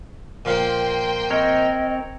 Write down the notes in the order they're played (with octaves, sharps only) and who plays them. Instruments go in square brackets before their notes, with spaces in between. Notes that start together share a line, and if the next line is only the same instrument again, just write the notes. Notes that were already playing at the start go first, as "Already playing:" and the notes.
[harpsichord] A#2 F3 F5 [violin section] A#3 G5 C6
[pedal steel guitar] C4 A#4 C#5 [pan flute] D#5